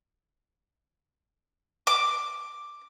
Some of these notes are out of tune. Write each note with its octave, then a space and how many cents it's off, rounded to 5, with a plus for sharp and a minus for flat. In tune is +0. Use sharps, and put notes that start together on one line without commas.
D6 +5